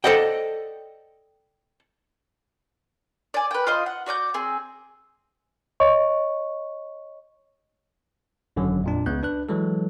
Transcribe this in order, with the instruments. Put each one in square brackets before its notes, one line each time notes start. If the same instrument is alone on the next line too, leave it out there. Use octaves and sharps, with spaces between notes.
[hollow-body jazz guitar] A4 C5 D5 D#5 F#5 G5
[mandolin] D5 G#5
B4 G5
F4 C5 D#5
F#5
F#4 D5 D6 G6
C4 G#4
[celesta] C#5 D#5 C#6
[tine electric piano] G#1 F#2 D3 F#3
F2 A#2 D4
C#2 C#3 B3 F#6 G6
D4 B4 F#6
E3 F#3 G#3 A4